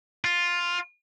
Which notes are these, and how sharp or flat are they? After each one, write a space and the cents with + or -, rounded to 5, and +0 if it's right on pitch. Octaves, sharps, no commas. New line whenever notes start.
F4 +5